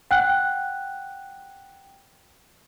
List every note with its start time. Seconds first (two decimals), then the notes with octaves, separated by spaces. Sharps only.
0.11 F#5 G5 F#6